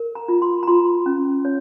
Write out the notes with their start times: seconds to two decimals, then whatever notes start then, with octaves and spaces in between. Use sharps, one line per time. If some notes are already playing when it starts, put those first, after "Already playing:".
Already playing: A#4
0.15 A#5
0.28 F4
0.42 C6
0.63 A#5
0.67 F4 C6
1.06 C#4
1.45 C#5